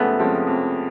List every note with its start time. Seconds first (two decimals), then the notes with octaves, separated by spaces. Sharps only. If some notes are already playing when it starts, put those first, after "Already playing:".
Already playing: F2 C3 F3 G#3 A3 B3 C#4
0.19 C3 F3 G#3 C#4
0.47 F2